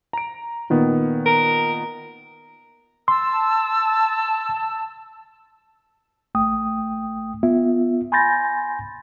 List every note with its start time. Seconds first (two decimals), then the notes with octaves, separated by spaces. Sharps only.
0.13 A#5 D7
0.70 A#2 D#3 B3
1.26 A#4
3.08 A5 C6 E6
6.35 A1 A3 G5 D#6
7.43 B3 F4 E5
8.12 G#5 B5 C6 G6 A6 A#6